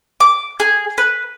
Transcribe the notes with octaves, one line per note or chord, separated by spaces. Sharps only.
D6
G#4
B4